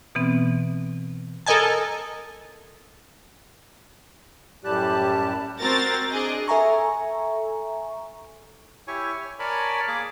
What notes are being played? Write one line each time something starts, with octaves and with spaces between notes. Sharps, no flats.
B2 E3 B3 C4
A4 A#4 D#5 G#5 A5
F#2 A2 G3 G4 A5 F#6
C4 F#4 A#4 A6 A#6
D4 G#4 D#5
A4 E5 G#5 A#5 C#6
E4 G4 C#5 G#5 C#6
C#5
A#4 C#5 D5 G#5 A5 B5
A#3 G#4 D6